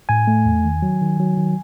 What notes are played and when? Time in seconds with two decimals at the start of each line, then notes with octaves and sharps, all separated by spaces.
0.09 A2 G#5
0.27 A3
0.46 E2
0.65 D#3
0.82 F#3
1.02 D#3
1.19 F#3
1.38 D#3